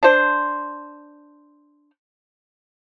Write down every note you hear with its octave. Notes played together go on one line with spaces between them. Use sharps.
D4 C5